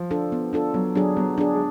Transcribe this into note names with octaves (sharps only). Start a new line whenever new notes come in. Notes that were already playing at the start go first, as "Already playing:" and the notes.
Already playing: F3
D4 F4 A4
B3
D4 F4 A4
F#3 B3
F#3 D4 G#4
F#3 B3
D4 G#4
G#3